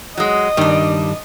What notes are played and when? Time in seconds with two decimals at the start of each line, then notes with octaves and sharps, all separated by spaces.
0.17 F#3 G#3 D#5
0.57 G2 D#3 G3 D4